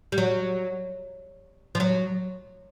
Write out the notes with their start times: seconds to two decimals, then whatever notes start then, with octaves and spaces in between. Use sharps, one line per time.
0.12 G3
0.18 F#3
1.75 F3
1.80 F#3